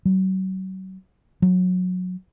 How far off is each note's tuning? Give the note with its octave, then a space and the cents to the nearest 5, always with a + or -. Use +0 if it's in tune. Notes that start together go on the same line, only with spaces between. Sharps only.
F#3 +35
F#3 -20